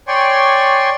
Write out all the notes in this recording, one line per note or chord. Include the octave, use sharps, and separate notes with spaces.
C#5 D5 G5 G#5 C6 C#6